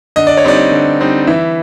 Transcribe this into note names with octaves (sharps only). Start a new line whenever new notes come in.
D3 D#5
D5
C#5
G3 C4 D#4 D5
D3
G3 C4 D#4
E3 E5